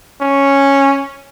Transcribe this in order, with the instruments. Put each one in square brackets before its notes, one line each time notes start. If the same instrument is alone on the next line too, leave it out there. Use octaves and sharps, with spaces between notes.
[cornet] C#4